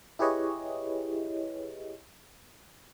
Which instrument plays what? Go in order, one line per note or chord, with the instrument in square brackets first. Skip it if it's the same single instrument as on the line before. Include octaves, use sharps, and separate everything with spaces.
[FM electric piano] E4 G4 G#4 B4 C#5 D#5